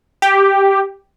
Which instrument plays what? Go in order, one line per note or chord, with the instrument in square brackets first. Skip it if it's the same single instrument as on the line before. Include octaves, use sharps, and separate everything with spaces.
[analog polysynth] G4